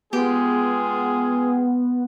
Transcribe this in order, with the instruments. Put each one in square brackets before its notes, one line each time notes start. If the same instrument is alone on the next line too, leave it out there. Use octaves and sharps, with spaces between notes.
[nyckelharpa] G#3 F4 [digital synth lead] B3 [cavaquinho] G4 [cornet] G#4